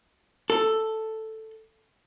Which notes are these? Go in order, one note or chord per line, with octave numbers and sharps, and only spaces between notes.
A4